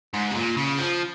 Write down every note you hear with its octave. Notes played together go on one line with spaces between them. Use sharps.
G#2
C3
A#2
C#3
F3